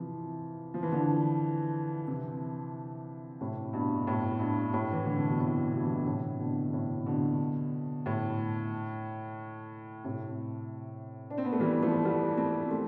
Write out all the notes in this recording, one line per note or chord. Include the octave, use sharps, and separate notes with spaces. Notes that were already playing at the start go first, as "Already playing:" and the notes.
Already playing: C3 E3 F3
F3
E3
D3 F3
C3 E3
A2 C3
G2 B2
A2
G2
A2
E3
D3
C3
B2
A2
G2 B2
E3
D3
A2 C3
B2 D3
A2 C3
B2 D3
A2
A2 C3
D4
C4
B3
A3
E3 G3
F3 A3
G3 B3
A3 C4
A3 C4